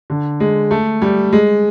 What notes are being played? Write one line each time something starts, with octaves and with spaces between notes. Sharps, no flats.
D3
G#3
A3
G3
G#3